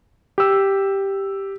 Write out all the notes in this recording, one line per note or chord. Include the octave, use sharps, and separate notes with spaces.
G4 E6